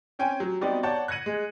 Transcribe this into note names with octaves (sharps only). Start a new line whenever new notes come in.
C4 C#4 G5 G#5
F#3
G3 B3 C4 D#4 F#4 D5
C#5 D5 F#5 A5 G6
F#6 G#6 A#6 C#7 D#7 F#7
G#3